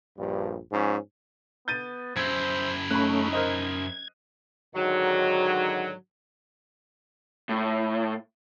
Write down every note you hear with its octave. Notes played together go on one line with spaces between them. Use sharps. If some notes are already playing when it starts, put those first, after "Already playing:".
A#1 G2
G#2 F3 C#4
B3 G6 A6 D#7
F#2 E4 C5 E6 G#6
A3 C#4 D#4 B5 F#6
A#4 C5 D#5 G#6
G#2 D3 D#3 F#3
A2